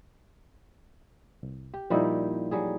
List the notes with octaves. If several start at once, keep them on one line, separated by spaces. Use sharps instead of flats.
C2
G4
A#2 F3 G3 A#3 D#4 E4
F#3 G3 G#4